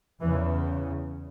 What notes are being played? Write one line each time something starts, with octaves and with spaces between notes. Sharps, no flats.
E2 C#3 E3